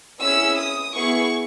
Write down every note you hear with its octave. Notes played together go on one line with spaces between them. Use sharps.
C#4 E4 G#4 E6
D#6
B3 E4 G#4 C#6